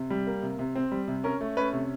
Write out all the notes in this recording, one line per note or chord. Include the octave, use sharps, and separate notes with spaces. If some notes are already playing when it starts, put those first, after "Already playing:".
Already playing: C3
G3
A#3
C3
C3
C4
G3
C3
C#4 A#4
A3
C#4 B4
C3